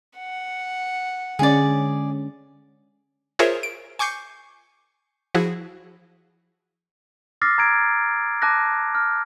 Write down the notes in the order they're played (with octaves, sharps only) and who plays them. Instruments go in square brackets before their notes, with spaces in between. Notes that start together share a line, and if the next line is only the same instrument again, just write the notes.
[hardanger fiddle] F#5
[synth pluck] D3 G#3 C#4 [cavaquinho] G#4 D5
[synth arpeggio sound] F4 G#4 A#4 C5 C#5 E5
D7
G#5 C#6 D6 G6 C7 C#7
F3 E4 F#4 G#4
[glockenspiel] D6 E6 F6 A6 A#6 C7
A#5 G#6 D7
A5 D6 F#6 A#6
F6